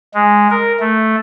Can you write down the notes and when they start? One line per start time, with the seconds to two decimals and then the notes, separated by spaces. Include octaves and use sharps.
0.14 G#3
0.50 A#4
0.80 A3